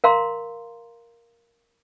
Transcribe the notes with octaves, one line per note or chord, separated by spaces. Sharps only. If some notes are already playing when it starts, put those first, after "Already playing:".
A#4 F5 A#5 C6